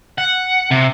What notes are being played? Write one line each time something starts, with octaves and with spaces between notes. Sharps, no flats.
F#5
C3